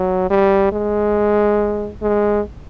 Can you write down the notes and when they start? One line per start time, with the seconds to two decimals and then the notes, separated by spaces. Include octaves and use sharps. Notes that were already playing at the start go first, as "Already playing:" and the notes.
Already playing: F#3
0.30 G3
0.73 G#3
2.02 G#3